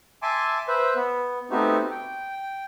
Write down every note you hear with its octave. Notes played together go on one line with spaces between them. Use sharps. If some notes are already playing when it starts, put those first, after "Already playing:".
E5 G#5 A5 C6 D6
B4 C5 E5
B3
A3 B3 C4 D#4 F#4 G4
G5